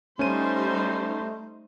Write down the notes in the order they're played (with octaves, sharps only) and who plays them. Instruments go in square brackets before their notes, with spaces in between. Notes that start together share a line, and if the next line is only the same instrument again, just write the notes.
[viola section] G3 D#4 C5 [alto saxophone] A3 [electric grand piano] C#4 D#7